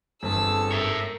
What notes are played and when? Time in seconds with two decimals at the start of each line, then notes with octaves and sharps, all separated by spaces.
0.23 G1 C4 G#4 A4 A5 E6
0.71 A#4 C#5 E5